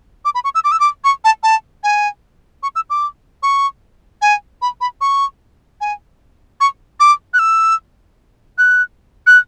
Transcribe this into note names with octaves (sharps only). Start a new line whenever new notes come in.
D6
B5
C#6
E6
D6
E6
D6
C#6
A5
A5
G#5
C#6
E6
D6
C#6
G#5
B5
B5
C#6
G#5
C#6
D6
F#6
E6
F#6
F#6